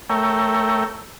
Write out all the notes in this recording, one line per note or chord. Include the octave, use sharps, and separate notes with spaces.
A3 A#4 C#5 E5 G5